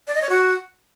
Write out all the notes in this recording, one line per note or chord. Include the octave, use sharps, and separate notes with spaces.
D5
D#5
C#5
F#4